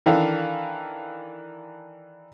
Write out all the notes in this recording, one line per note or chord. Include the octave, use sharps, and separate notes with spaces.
D#3 E3 D4 A4 F5